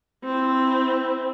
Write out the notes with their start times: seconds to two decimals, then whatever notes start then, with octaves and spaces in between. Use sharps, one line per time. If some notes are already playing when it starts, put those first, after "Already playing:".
0.24 C4 E4